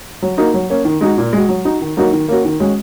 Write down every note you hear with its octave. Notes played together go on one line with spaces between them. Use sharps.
F#3
A#3 D#4 F#4
F#3
A#3 C#4
D#3
G#3 D#4 F#4
A#2
G#3 F#4
F#3
D#4 F#4
D#3
F#3 A#3 D#4 F#4
D#3
A#3 C#4 F#4
D#3
G#3 C#4 F#4